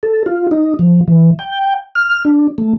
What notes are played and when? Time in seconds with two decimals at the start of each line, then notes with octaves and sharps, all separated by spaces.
0.03 A4
0.26 F4
0.51 D#4
0.79 F3
1.08 E3
1.39 G5
1.95 F6
2.25 D4
2.58 A3